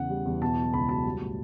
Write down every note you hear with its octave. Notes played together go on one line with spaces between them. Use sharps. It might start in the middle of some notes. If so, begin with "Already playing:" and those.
Already playing: E2 C#3 F#5
G3
E2
B2 A5
F#3
C#2 B5
F#3 A5
G3
A2